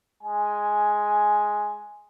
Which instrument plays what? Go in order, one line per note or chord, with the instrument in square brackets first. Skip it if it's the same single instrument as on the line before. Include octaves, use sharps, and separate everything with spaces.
[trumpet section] G#3 G#5